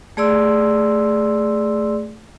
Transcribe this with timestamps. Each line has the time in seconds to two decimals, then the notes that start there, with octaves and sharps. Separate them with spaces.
0.17 A3 G#4 D5 C6 E6